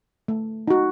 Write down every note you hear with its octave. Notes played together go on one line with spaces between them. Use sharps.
A3
D#4 F#4